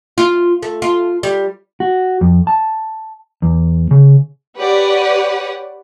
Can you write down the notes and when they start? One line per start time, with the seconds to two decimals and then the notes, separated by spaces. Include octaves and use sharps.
0.18 F4
0.63 A3
0.82 F4
1.23 G3
1.80 F#4
2.21 F2
2.47 A5
3.42 E2
3.91 C#3
4.57 G4 B4 C#5 D5 F#5